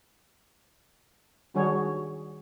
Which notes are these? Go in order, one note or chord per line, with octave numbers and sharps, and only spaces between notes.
D#3 G3 D4 F#4 G#4 C#5